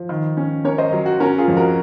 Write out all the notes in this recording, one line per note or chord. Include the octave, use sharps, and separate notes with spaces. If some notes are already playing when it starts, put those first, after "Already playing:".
Already playing: F3
D#3
C#4
C#4 A#4 C#5
C5 D#5
F#3
F#4
C#4 F#4 A#4
F4 G#4
F2
F#4 A#4